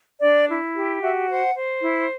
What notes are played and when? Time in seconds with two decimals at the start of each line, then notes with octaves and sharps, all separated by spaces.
0.20 D4 D5
0.48 E4
0.75 G4
1.01 F#4 E5
1.29 C5 F#5
1.55 C5
1.82 E4